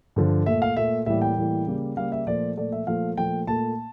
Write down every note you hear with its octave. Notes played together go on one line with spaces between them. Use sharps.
G2 D3 F3
A#2 A3 E5
F5
A#2 A3 E5
A2 E3 G3 A#3 E5
G5
A2 E3 G3 A#3
C#3 G3 A#3
C#3 G3 A#3 F5
E5
A#2 F3 A3 D5
A#2 F3 A3 D5
E5
A#2 F3 A3 F5
A#2 F3 A3 G5
A#2 A3 A5